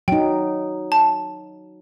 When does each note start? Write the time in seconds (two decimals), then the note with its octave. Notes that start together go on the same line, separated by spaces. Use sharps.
0.08 F#3 D#4 G5
0.92 A5